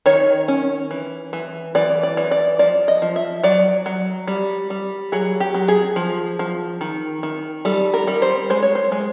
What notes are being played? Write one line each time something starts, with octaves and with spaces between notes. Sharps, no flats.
D#3 C#5
C#4
E3
E3
E3 D5
D5
E3
D5
F3 D5
D#5
F3
E5
F#3 D5
F#3
G3
G3
F#3 G#4
G4
F#3
G#4
F3
F3
D#3
D#3
G3 A4
A#4
G3
C5
G#3 C5
C#5
C5
G#3